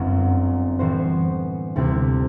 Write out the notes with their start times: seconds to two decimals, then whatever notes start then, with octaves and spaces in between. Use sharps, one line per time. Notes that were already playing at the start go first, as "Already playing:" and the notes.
Already playing: G1 F#2 F#3 C4
0.79 A2 E3 B3 F#4 C5
1.76 D2 C3 G3 C4 E4